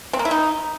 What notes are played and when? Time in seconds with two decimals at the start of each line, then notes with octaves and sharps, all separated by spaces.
0.13 C4
0.19 A#3
0.25 E4
0.31 D#4